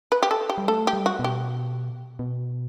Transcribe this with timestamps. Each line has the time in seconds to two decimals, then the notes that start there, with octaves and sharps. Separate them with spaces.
0.12 B4
0.23 G4
0.31 A4
0.50 G4
0.58 G3
0.68 A3 A4
0.87 G4
0.93 G3
1.06 F#4
1.19 B2
1.24 G4
2.19 B2